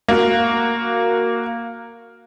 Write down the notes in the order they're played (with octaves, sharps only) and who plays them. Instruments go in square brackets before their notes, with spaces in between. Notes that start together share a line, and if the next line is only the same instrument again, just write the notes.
[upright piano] A#3 F#4